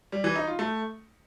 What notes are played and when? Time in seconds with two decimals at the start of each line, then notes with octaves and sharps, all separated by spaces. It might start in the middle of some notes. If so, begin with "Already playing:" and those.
0.12 G3
0.24 E3
0.36 D#4
0.47 F4
0.59 A3